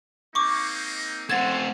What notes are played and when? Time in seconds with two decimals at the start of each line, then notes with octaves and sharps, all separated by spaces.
0.35 A#3 C4 D#4 C#6 D6
1.30 A3 C4 F#5 C6 G#6 A6